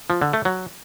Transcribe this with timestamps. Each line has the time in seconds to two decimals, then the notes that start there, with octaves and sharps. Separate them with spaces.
0.10 F3
0.22 D3
0.33 A3
0.45 F#3